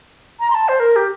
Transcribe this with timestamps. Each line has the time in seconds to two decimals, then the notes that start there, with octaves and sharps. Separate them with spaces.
0.40 A#5
0.50 C6
0.54 A5
0.69 C5
0.80 A#4
0.96 G4